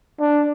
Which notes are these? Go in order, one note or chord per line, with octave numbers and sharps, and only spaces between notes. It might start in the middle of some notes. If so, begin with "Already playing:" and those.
D4